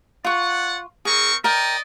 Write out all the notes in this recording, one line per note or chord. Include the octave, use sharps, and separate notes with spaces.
F4 D5 F#5 C#6
C4 G#4 A#4 C#6
A#4 D5 D#5 G5